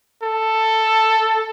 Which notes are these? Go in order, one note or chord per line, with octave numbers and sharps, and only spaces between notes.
A4